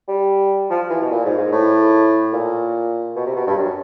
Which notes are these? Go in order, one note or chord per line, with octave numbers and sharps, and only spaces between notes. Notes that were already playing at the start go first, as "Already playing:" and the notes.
G3
F3
E3
B2
A#2
G#2
G#2
A2
A#2
B2
C3
B2
G2
F#2